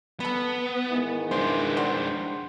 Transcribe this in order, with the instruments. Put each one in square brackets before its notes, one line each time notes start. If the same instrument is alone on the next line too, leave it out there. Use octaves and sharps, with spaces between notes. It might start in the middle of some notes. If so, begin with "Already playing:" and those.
[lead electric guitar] B3 [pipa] A4 B4
[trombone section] G#2 D#3 E3
[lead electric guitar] G#3 D4 [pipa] C5
[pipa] G3 F#4 C5